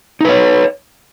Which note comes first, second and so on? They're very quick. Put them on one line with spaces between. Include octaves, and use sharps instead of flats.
D#4 B4 C#5